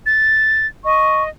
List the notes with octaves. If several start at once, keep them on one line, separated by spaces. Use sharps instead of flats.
A6
D#5 C#6